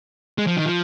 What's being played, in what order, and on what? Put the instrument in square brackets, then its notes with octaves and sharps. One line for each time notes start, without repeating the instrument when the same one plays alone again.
[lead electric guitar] G#3
F3
D#3
F3